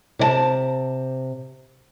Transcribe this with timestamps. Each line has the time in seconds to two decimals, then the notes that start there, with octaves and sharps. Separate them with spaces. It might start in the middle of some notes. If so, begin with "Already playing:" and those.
0.19 C3 C#5 A5